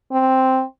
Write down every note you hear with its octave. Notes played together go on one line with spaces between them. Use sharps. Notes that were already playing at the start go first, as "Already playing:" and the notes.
C4